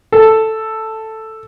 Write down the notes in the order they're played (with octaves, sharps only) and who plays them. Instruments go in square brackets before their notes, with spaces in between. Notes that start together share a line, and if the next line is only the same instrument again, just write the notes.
[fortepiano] A4